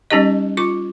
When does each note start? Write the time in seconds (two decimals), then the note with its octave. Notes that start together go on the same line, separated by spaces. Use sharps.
0.11 G3 C#4 D#4 G4 D#5
0.57 F4 D6